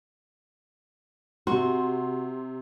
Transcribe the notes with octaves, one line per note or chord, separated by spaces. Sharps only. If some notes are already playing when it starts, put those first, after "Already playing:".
C3 F#4 C6